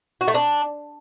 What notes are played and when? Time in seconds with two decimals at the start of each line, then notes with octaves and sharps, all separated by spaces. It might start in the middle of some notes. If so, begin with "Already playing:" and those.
0.21 F#4
0.28 A3
0.34 D4